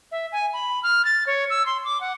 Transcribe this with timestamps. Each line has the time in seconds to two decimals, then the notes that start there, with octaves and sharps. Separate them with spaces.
0.12 E5
0.32 G#5
0.53 B5
0.83 F6
1.05 A6
1.27 C#5
1.50 E6
1.66 C6
1.85 D6
2.01 F#5